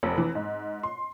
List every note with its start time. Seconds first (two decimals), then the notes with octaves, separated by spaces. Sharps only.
0.03 F1
0.18 E3
0.35 G#2
0.83 C6